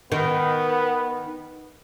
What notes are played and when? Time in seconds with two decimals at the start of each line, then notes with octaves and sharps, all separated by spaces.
0.12 D#3 B3